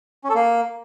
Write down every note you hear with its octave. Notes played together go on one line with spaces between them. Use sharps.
C#4
A4
A#3